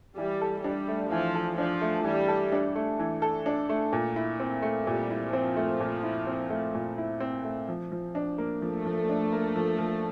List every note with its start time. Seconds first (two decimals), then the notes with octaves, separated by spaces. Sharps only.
0.17 E3 G3
0.41 A4
0.64 G3 D4
0.88 A3
1.11 E3 F3
1.35 A4
1.58 F3 D4
1.81 A3
2.04 E3 G3
2.28 A4
2.52 D4
2.76 A3
2.99 E3
3.22 A4
3.46 D4
3.69 A3
3.93 A#2
4.16 E4
4.40 C4
4.62 A3
4.87 A#2 G3
5.11 E4
5.33 F3 C4
5.56 A3
5.80 A#2
6.03 E4
6.27 C4
6.50 A3
6.74 A#2
6.98 E4
7.20 C4
7.44 A3
7.69 F3
7.92 F3
8.15 D4
8.38 A#3
8.62 F3 A3
8.86 F3
9.09 D4
9.32 A#3
9.56 F3
9.78 F3